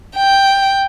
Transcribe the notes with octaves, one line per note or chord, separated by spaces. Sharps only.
G5